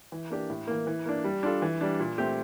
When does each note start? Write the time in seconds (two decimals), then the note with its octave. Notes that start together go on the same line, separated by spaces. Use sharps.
0.12 E3
0.30 A#3 D4 G4
0.50 A2
0.67 E3 A#3
0.87 E3
1.06 A#3 D4
1.24 G3
1.43 D4 F4 A4
1.62 E3
1.81 G3 D4
2.00 A#2
2.18 A3 C4 G4